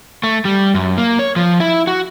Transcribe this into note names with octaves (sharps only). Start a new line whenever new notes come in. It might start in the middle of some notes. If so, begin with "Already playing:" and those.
A3
G3
F#2
A#3
C#5
F3
E4
F#4